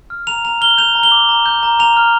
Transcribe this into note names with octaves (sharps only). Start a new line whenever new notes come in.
F6
A#5 F7
A#5 F7
F6 G7
G6 F7
A#5
G7
D6
A#5
G6
A#5
A#5 F7
F6